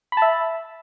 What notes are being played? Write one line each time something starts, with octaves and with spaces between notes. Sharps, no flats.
E5 A5 B5